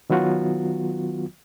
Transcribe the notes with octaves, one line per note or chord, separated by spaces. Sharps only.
D#3 F#3 B3 F4 F#4